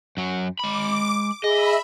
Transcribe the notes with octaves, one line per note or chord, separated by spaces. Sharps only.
F#2 F#3
G#3 B5 D6
G#4 D#5 E5 B5